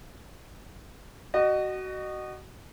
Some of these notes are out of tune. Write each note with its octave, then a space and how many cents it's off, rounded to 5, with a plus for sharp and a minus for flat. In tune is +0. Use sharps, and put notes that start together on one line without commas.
F#4 +20 D#5 -30